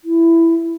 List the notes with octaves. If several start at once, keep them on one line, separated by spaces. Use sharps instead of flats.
E4